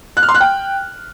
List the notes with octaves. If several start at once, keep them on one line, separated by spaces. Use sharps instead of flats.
F#6
F6
C6
F#6
G5